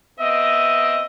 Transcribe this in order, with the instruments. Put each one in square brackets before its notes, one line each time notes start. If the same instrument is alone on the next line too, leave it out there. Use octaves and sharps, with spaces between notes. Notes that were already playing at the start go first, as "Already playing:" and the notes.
[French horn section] B3 C4 D#5 [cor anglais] E5